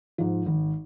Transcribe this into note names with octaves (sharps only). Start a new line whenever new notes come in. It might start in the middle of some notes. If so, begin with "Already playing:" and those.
G#2 F3
G#1